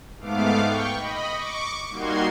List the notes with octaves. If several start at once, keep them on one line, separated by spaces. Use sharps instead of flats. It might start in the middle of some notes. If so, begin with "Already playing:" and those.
G#2 A3 B3 F5 D6
G5 C#6
D#5 B5
C#6 D6
G3 A#3 D#4 F#4 C6 G#6